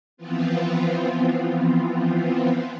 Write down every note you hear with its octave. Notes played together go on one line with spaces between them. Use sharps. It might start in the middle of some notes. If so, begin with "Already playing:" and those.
E3 F3 B3 C4 F4